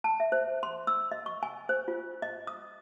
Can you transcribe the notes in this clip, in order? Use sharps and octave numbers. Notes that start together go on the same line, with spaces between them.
A5
E5
C5
C6
E6
D#5
C#6
G#5
C5
F4
D#5
D#6